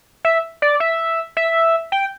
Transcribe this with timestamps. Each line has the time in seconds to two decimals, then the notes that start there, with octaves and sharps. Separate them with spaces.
0.25 E5
0.62 D5
0.80 E5
1.37 E5
1.92 G5